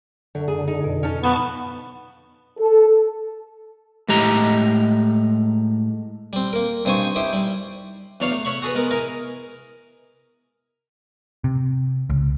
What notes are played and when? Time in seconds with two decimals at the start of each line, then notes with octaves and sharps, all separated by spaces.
0.35 F#2 D3
0.48 F#2 G#4
0.68 D#4
0.81 F2 B2
1.03 B2 C#4 D#4 A5 F6
1.23 F3 F#3 B3 D#4 A5 C#6
2.59 A4
4.09 A2 G#3 G4 D#5 A#5
6.33 G3 C4
6.53 A#3 A#4
6.85 G2 C4 D#4 C5 G#5 C#6
7.16 D#4 E4 G4 C5
7.33 G3
8.20 E2 F#3 D4 C#5 F5
8.32 A3
8.45 C#5 E5 F#5 C#6
8.62 F#4 G#4 A4 B4
8.75 G#3 B3 A#4
8.91 E4 A#4 D#5 G#5
11.44 C3
12.10 C#2